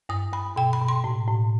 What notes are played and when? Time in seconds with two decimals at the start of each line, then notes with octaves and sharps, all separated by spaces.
0.09 G2 D#6
0.33 G2 B5
0.56 B2 G5
0.73 B5
0.81 B2
0.88 C6
1.04 A2
1.28 A2